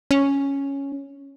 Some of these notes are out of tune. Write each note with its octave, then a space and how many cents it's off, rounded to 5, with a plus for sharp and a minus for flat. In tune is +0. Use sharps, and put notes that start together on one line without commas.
C#4 +0